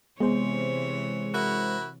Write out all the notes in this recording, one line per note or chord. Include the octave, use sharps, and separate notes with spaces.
C3 E3 G#3 B3 G#4 C5 C#5
E4 F#4 A#4